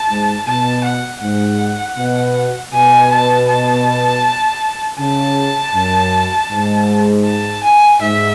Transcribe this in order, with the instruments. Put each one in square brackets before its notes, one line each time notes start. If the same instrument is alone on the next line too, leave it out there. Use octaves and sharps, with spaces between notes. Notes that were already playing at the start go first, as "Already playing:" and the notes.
Already playing: [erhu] A5
[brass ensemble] G#2
[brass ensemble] B2 [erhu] A5
[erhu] F#5
[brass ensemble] G#2 [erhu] F#5
[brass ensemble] B2
[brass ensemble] B2 [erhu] G#5
[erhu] A5
A5
[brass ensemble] C#3 [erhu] A5
[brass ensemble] F#2
G#2
[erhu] A5
G#5
[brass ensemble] G#2 [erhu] E5